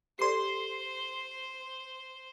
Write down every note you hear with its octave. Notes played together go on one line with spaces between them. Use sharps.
G4 A4 C5 D5 C6 C7